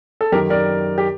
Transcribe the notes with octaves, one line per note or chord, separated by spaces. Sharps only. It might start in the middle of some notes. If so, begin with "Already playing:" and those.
A4
F#2 D#3 G4 A#4
A#4 D5
G4